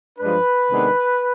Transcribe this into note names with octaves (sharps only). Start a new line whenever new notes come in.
G2 F3 G#3 D4 B4
C3 D#3 G#3 B3 D4